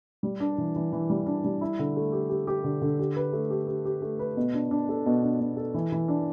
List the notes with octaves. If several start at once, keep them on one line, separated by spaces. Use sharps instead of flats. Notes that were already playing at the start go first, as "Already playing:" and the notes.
G3
D4
E3
E3
E3
G3
D4
G3
E4
D3
A3
G4
G4
G4
D3
D3
G4
B4
A3
G4
G4
G4
A3
B4
B2
D4
D4
A4
B2
D4
B2
A4
E3
E3
D4